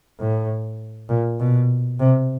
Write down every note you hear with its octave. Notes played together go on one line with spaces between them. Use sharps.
A2
A#2
B2
C3